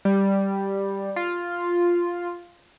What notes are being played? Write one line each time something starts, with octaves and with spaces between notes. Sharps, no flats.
G3
F4